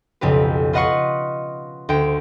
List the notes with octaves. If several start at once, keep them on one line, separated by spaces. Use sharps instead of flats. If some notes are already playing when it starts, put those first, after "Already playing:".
B1 F2 C#3 G4 B4
F4 B4 D#5 F#5 C6 C#6
D2 C5 G5 D7